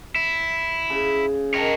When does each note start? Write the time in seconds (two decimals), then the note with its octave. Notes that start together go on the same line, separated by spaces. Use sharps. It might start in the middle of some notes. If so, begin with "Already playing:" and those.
0.16 E4
0.90 C#3
1.54 D#3 A#4 C#5 A5